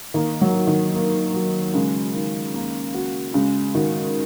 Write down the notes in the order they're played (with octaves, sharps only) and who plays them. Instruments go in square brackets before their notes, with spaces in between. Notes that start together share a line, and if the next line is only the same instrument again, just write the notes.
[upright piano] D#3 [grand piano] A#3
[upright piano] F#3
[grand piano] F#4
[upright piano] D#3
[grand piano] A#3
F#3
[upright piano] C#3 [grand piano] G#3
[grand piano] D#3
A#3
F#4
[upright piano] C#3 [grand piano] G#3
[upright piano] D#3 [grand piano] F#4